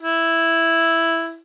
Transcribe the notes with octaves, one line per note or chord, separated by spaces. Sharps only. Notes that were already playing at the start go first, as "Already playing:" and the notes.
E4